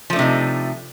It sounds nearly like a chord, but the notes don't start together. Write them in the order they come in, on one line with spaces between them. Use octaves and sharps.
F3 A3 D4 C3 D#4